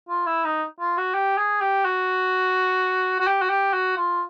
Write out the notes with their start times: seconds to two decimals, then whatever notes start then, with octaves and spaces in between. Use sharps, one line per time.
0.09 F4
0.26 E4
0.45 D#4
0.80 F4
0.98 F#4
1.14 G4
1.38 G#4
1.61 G4
1.85 F#4
3.20 F#4
3.27 G4
3.42 F#4
3.50 G4
3.74 F#4
3.97 F4